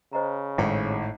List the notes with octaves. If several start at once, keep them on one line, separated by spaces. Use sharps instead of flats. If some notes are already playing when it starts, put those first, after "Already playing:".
C#3 C5 D#5 A#5
G#1 A2